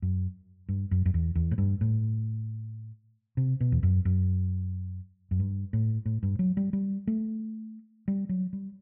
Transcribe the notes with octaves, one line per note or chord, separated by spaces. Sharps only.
F#2
G2
F#2
F#2
E2
E2
A2
G2
A2
C3
B2
E2
F#2
F#2
F#2
G2
A2
A2
G2
F#3
G3
G3
A3
G3
F#3
G3